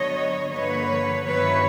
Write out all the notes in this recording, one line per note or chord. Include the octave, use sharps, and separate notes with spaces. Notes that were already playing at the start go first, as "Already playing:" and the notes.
Already playing: D3 F#3 B3 D4 C#5 D#5
G2 D3 F3 A#3 B4 C#5
G2 D#3 F#3 B3 E4 B4 C#5